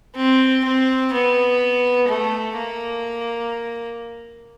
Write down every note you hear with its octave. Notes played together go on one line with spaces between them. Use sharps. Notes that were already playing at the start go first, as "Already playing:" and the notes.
C4
C4
B3
A3
A#3